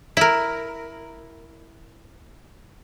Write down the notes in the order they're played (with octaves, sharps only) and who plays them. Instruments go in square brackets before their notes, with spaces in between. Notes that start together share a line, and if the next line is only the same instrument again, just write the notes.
[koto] E4 A#4